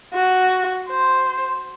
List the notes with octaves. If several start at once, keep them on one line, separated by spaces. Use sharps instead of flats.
F#4
C5